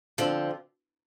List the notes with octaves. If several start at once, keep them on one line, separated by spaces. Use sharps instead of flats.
D3 F3 C4